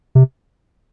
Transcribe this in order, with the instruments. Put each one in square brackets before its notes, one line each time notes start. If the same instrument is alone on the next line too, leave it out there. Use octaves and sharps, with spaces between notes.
[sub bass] C3